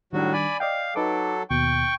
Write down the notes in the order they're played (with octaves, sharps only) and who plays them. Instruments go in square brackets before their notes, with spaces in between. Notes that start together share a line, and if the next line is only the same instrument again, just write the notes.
[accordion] A2 F#3 F#4 [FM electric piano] D#3 G3 D4
[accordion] D5 G#5 B5
[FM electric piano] D5 D#5 G5 [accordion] F5
[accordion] F#3 A4 [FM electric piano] D#4 B4 D6
[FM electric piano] D#2 B2 [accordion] G5 C#6